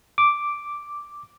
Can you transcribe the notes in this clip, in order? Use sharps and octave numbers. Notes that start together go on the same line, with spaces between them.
D6